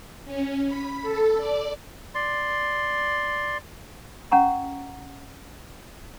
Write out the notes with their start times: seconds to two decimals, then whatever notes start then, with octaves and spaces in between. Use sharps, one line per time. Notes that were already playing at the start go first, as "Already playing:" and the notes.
0.25 C#4
0.66 B5
1.02 A4
1.37 D5
2.15 D5 C6
4.32 C#4 F#5 A#5 C#6